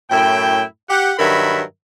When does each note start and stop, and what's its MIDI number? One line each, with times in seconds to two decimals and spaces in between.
0.11 0.63 42
0.11 0.63 45
0.11 0.63 64
0.11 0.63 79
0.90 1.13 67
0.90 1.13 78
1.19 1.63 43
1.19 1.63 51
1.19 1.63 54
1.19 1.63 70
1.19 1.63 76
1.19 1.63 83